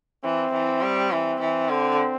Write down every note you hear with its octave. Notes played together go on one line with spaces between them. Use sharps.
E3 C4
E3
G3
E3 C4
E3
D3